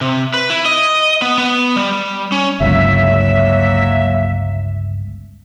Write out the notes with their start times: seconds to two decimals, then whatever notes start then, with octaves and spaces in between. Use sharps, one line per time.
0.01 C3
0.34 B4
0.50 E4
0.65 D#5
1.22 B3
1.38 B3
1.76 G3
2.32 C#4
2.61 G1 C#2 F#3 A#3 E5